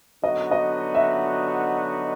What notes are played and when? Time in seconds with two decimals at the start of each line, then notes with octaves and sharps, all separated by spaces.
0.24 D3 F#3 B3 D#4 F#4 D#5
0.51 D#5
0.95 E5